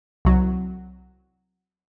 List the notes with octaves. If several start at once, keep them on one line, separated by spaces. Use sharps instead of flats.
C2 F#3